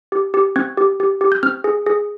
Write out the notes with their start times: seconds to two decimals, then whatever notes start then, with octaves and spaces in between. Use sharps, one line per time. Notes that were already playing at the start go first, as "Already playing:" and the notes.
0.12 G4
0.34 G4
0.56 C4 G#6
0.77 G4
1.00 G4
1.21 G4
1.32 G6
1.43 C4 F6
1.64 G#4
1.86 G#4